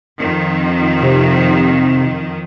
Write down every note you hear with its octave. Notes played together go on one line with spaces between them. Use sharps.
F2 D#3
C3